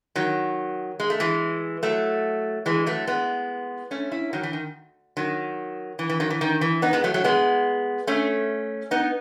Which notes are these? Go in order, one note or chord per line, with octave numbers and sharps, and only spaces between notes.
D#3 F#3
G#3
A3
E3 G#3
F#3 A3
E3 G#3
F#3 A3
G#3 B3
A3 C#4
C#4 E4
D#3 F#3
E3
D#3
D#3 F#3
E3
E3
D#3 F#3
E3
D#3
E3
B3 D#4
G#3 B3
F#3 A3
F#3 A3
G#3 B3
A3 C#4
B3 D#4